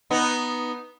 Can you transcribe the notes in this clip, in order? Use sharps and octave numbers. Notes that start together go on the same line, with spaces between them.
B3 D#4